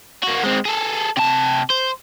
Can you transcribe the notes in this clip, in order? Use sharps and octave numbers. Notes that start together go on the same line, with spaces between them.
A#3 F#4
G#3 C4
G#4 A4
C3 A5
C5